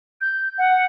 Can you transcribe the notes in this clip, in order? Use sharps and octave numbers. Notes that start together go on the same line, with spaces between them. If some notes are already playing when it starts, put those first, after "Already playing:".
G6
F#5